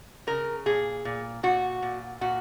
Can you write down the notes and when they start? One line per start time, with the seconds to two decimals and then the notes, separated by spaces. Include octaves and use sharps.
0.27 C#3 A#4
0.66 A#2 G#4
1.05 A#2
1.43 A#2 F#4
1.82 A#2
2.21 A#2 F#4